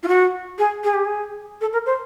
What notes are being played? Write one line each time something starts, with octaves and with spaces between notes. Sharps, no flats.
F4
F#4
G#4
G#4
G4
G#4
A4
A#4
C5